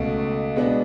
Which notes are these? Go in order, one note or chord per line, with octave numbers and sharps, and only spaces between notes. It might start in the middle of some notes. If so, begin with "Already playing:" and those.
Already playing: C#2 B2 A3
B2 G#3 B3 D4